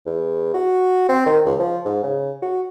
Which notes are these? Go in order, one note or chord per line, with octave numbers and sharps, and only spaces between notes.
E2
F#4
C4
D#3
C#2
F3
G#2
C#3
F#4